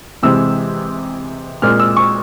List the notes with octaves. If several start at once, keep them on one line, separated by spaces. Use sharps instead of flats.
C3 E3 G#3 C4 E6
A#2 G#3 C4 F6
E6
C#6